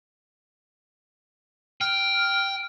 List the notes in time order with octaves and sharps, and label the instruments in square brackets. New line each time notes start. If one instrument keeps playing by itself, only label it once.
[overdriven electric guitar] G5 [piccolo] F6